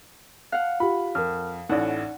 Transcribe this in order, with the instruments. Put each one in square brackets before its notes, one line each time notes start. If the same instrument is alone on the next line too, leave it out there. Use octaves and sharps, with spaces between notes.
[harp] F5 F#5 [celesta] F#6
[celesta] F4 G4 [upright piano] B5
[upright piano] F2 [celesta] A#4 F6
[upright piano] A1 A2 [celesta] D#4 D5 [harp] F#5